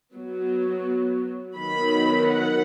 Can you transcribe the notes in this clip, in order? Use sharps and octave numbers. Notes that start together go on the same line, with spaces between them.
F#3 B3
D#3 F#3 B3 B5
F#5